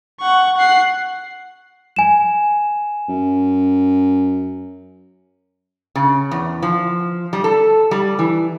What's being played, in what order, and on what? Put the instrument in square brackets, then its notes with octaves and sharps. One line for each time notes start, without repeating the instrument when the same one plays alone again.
[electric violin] F#5 C#6
F#5 C7
[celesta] G#5 E7
[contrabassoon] F#2
[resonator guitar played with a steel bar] C#3
E2
F3
G3
A4
G3
E3